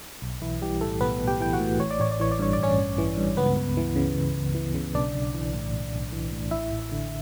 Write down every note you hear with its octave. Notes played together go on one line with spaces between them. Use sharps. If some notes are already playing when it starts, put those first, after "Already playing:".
B1
B1 E3 E4
E3 G3 G4
A2 A3 A4
B1 B3 B4
B1
G4 G5
E3 G5
F#4 F#5
A2
A1 C#5
D5
A1 C#5
D5
E3 C#5
D5
G2 C#5
D5
A1 C#4 C#5
A1
E3
G2
C#2 B3 B4
C#2
E3
C#3
C#2
C#2
E3
C#3
B1 D4 D5
B1
E3
A2
B1
B1
E3
A2
A1 E4 E5
A1
D3